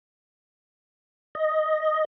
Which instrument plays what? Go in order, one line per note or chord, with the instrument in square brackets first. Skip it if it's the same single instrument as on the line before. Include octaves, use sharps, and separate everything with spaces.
[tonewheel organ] D#5